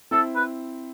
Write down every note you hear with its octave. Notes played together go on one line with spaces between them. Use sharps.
C4 E4 A4
B4